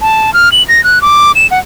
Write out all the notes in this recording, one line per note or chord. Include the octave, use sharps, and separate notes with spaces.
A5
F6
F#7
A#6
F#6
D6
E7
F#5